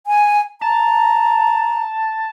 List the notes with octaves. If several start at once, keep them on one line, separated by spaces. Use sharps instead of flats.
G#5
A5 A#5